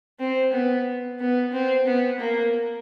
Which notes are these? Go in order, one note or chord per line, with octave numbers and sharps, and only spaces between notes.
C4
B3
B3
C4
B3
A#3